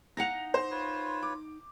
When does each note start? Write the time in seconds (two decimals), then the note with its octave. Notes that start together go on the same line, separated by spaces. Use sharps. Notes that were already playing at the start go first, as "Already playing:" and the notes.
0.17 D#4 F5 F#5 A#6 F7
0.54 C5
0.71 F4 B4 C#5
1.23 D6